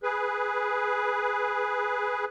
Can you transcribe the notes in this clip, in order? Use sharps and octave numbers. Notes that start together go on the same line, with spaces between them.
G#4 B4